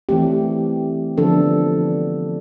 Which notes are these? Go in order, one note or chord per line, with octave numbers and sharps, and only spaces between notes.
E3 A3 C4 G4
D3 F3 B3 D4 A4